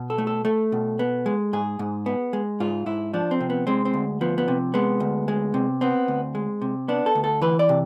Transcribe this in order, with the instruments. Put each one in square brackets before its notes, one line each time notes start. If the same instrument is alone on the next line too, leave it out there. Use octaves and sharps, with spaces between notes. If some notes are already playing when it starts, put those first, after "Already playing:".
Already playing: [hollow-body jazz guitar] B2
A4
A3
A4
A3 A4
B2
B3
G#3
G#2 G#4
G#2
B3
G#3
G#2 F4
G#2 E4
F3 D4
C4
C3
B3
G#3 C4
C4
D2
F3 B3
B3
C3
G#3 B3
D2
G#3
C3
B3 C4
D2
G#3
C3
B3 D4
A4
D2
A4
E3 B4
D5
C3